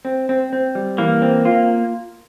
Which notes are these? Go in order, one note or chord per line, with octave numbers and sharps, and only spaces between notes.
C4
C4
C4
G3
E3 A#3
C4
F4